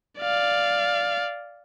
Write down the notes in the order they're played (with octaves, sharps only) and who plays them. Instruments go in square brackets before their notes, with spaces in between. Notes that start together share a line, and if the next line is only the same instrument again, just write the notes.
[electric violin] D5 F5